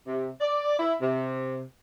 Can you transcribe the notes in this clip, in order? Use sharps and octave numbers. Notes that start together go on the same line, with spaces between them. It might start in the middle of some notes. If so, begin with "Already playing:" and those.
C3
D5
E4
C3